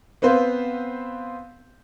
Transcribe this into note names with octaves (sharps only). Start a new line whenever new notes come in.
B3 C4 B4 C5 F5